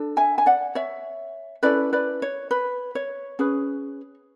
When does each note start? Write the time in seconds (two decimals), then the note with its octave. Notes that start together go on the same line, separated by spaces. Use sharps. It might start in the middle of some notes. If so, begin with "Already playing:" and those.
Already playing: D4 A4
0.17 E5 G#5
0.38 G#5
0.46 D5 F#5
0.75 C#5 E5
1.63 C#4 E4 A4 B4 D5
1.93 B4 D5
2.22 C#5
2.51 B4
2.95 C#5
3.39 C#4 G#4 B4